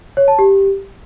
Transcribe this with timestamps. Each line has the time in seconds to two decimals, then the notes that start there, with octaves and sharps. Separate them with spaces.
0.17 C#5
0.28 A5
0.39 G4